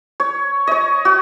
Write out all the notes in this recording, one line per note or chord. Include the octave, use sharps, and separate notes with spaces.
C#5
C#5 D#5
F#4